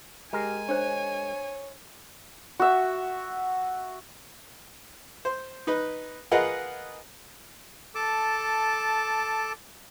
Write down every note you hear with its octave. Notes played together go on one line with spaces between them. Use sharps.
G#3 G4 A#4 G#5
D4 C5 C#5
F#4 E5
C5
D#4 B4
F4 G#4 A#4 B4 D#5 F#5
A4 A5 D6